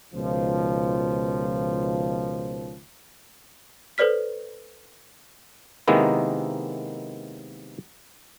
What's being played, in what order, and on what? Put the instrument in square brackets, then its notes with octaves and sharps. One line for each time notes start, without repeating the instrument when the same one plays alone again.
[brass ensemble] C#2 B2 D#3 F3
[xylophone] A4 B4 C5 D5 F6 B6
[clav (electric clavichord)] C3 D#3 G#3 A#3 B3 E4